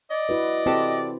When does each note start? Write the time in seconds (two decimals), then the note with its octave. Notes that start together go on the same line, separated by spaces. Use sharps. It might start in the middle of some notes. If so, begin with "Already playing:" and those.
0.11 D5 D#5
0.29 E4 F#4 B4
0.66 C4 E4 F#4 G4 A4 C5